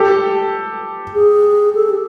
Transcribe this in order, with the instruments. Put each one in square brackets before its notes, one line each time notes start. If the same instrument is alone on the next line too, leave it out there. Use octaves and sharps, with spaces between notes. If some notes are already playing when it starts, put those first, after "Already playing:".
Already playing: [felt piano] G4 A4
[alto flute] G#4
A4
G4